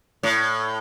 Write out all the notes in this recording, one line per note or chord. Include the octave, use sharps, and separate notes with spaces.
A2